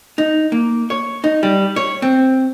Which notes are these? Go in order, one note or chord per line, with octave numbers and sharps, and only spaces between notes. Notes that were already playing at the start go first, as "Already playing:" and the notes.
D#4
A#3
C#5
D#4
G3
C#5
C4